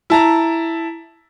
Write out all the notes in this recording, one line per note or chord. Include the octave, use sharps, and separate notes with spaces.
E4 A5 A#5